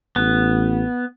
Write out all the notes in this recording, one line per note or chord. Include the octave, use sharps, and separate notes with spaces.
A1 B3